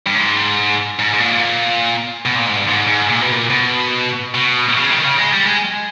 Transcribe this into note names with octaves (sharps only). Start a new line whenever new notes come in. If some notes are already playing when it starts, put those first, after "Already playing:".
G2
G#2
G#2
G#2
A#2
B2
A#2
G#2
G2
G#2
G#2
A#2
B2
A#2
B2
B2
C#3
D#3
C#3
G#3
G3
G#3